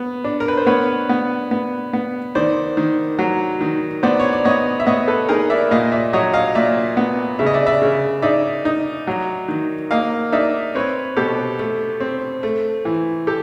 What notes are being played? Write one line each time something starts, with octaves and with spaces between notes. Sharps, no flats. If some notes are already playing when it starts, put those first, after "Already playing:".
Already playing: B3
D4
A#4
B4
C5
B3 B4 C#5
B3
B3
B3
D#3 C5 D5
D#3
F#3
D#3
B3 C5 D5
C#5
D5
B3 C#5 D#5
E5
B3 C#5 D#5
A4 B4
D#4 G#4 A#4
D5 E5
A#2 D#5 F5
D5 E5
F#3 C#5 D#5
D#5 F5
A#2 D5 E5
B3
C#3 E5
D#5
D5 E5
D5 E5
C#3
D#4 D5 E5
D#4
F#3
D#3
A#3 D#5 F5
D#4 D5 E5
C4 B4 C#5
B2 G4 A4
A3
C4
A3
E3
G4 A4